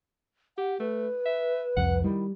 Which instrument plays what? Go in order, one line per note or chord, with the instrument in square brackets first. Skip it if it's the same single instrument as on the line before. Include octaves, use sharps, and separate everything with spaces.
[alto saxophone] G4 [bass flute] F#5
[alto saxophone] A3 [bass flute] B4
[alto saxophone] E5
[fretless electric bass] C2 F2 [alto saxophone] F#5
[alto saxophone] D#3 [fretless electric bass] G3 [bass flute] E4